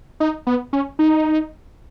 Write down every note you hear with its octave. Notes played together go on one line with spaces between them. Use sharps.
D#4
B3
C#4
D#4